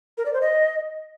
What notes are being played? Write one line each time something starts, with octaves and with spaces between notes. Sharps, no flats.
A#4
D5
C5
D#5